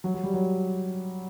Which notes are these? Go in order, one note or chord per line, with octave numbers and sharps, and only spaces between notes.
F#3
F#3
G3
F#3